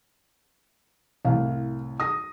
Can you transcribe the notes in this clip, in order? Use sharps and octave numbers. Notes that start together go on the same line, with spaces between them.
C2 A2 F5
D#6 A#6